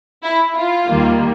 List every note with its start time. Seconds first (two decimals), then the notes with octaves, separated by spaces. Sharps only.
0.23 E4
0.56 F4
0.87 D#2 D#3 G3 A#3